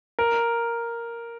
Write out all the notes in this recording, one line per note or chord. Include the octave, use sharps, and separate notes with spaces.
A#4